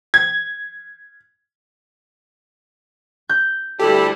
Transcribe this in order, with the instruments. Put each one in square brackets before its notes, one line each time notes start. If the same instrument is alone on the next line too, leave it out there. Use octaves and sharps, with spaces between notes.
[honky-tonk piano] G#6
[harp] G6
[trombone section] D2 A4 [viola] G3 E4 [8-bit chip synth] G4